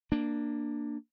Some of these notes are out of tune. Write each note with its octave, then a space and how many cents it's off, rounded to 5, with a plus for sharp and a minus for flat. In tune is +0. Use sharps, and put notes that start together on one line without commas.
A#3 +0 D4 +10